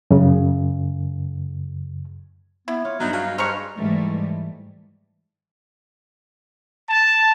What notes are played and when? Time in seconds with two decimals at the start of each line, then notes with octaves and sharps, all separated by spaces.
0.11 F#2 C#3
2.68 B3 E4
2.85 F4 C#5
3.00 G2 F#3 G3 B3 D#4
3.13 F#3 G#4 D#5 F5
3.38 G2 G#4 C5 A#5 C#6 F6
3.76 G#2 E3 G3 A3
6.90 A5